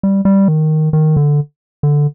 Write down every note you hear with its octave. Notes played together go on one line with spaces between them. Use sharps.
G3
G3
D#3
D#3
D3
D3